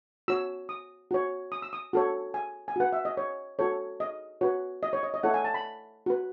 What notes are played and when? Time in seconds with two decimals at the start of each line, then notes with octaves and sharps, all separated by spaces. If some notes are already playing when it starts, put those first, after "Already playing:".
0.28 F#4 C#5 E6
0.69 D#6
1.11 F#4 C#5
1.52 D#6
1.62 E6
1.73 D#6
1.93 F#4 A4 C#5
2.34 G#5
2.68 G#5
2.76 F#4 B4 F#5
2.93 E5
3.05 D#5
3.17 C#5
3.59 F#4 A4 C#5
4.00 D#5
4.41 F#4 B4 C#5
4.83 D#5
4.93 C#5
5.03 D#5
5.14 D#5
5.23 E4 A4 C#5 F#5
5.34 G#5
5.44 A5
5.54 B5
6.06 F#4 B4